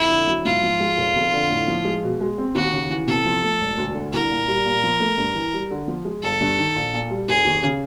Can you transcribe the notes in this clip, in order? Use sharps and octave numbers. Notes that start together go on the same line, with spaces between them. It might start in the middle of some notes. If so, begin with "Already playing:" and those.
Already playing: F2 E4
D3
F#3
G#2 F4
F3
G#3
F1
F2
D3
A2
F3
G#3
B2
G#3
C4
D#2 F#4
C#3
E3
C3 A4
F3
A3
E1
D2
D3
C2 A#4
A#2
G3
A#2
F3
A3
G2
E3
G3
D3
F3
G#3
G1 A4
G2
D#3
A#1
A#2
G3
F1 G#4
D#2
C#3